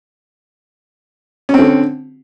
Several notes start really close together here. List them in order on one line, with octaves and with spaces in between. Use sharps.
C#4 C4 D3